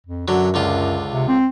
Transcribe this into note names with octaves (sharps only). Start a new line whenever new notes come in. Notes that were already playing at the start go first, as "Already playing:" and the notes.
F2
F#2 D3 F#3
C#2 D3 F4
C3
C4